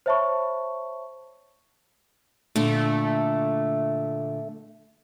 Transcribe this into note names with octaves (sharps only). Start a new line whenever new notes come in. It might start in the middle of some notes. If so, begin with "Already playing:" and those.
C5 C#5 E5 A5 B5 C#6
A#2 D3 A3